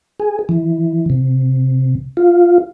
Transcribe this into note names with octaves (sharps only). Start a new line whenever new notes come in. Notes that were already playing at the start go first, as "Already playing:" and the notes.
G#4
E3
C3
F4